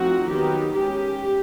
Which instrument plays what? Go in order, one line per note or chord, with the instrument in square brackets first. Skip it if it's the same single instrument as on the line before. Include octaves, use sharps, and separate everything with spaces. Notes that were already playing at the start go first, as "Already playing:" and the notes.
Already playing: [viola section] F3 A3 C4 D#4 F#4
D#3 F#3 B3 D#4 G4
G#3 C#4 G4